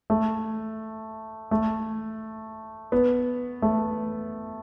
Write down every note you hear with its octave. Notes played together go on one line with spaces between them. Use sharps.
A3
A3
B3
A3